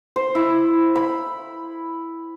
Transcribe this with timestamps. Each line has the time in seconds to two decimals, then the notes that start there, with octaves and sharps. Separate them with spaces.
0.16 C5
0.35 E4
0.95 B5